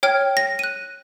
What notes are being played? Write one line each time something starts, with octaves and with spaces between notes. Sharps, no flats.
C#5 G5 F6 G#6
A#6
F#6 D#7